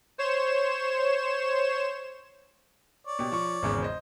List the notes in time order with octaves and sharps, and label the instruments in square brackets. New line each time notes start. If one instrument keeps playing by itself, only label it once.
[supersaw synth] C5 C#5 E7
[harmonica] C#5 D5
[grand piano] B2 G4
F3 C#6
G#1 E2 C#3
C5 D#5